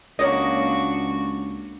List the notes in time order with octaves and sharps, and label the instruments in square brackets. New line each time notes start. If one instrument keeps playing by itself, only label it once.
[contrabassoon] C#2 [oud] A#3 C#5 D#5 [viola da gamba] D4 F#4